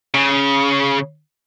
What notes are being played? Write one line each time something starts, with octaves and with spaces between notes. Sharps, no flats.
C#3